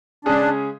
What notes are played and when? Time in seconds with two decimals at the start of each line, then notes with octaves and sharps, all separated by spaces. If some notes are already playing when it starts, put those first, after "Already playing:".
0.25 C#3 G#3 C#4 D4 G#4